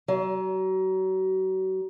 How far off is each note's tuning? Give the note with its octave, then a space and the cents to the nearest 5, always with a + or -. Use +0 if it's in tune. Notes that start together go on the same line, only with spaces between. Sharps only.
F#3 +35